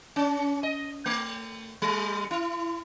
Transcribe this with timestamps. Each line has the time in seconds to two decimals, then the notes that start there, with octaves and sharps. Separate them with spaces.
0.16 C#4
0.63 D#5
1.06 A3
1.82 G3
2.31 E4